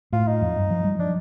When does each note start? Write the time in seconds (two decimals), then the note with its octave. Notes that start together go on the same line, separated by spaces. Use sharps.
0.13 A2 F4
0.27 D#4
0.41 F2
0.56 G2
0.70 F3
0.84 G3
0.99 F3 D4